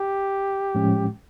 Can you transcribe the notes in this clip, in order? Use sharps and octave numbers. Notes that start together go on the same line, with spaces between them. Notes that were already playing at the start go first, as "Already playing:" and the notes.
Already playing: G4
A2 F3 G#3 C#4